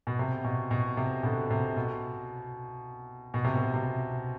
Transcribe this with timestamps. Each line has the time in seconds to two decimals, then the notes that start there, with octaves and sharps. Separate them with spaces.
0.07 B2
0.19 C3
0.44 B2
0.71 B2
0.97 C3
1.23 B2 D3
1.51 C3
1.76 B2
3.34 B2
3.45 C3
3.56 B2
3.74 C3